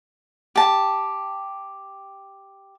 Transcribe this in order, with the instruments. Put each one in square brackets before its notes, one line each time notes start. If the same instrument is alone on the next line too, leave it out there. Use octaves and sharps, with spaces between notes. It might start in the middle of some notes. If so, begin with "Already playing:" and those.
[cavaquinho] G4 A5